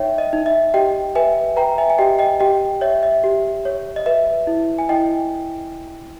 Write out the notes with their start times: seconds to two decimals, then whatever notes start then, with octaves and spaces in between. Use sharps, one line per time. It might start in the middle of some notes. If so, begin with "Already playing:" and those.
Already playing: D#4 C#5 E5 G5
0.18 D#5
0.33 D#4
0.46 E5
0.74 G4 D#5 G5
1.15 B4 E5 G#5
1.56 B4 G5 A#5
1.78 E5 G#5
1.90 G#5
1.98 G4 D#5 G5
2.19 D#5 G5
2.40 G4 D#5 G5
2.81 C#5 E5
3.03 E5
3.24 G4
3.65 C#5
3.96 D#5
4.06 B4 E5
4.47 E4
4.79 G#5
4.89 E4 D#5 G5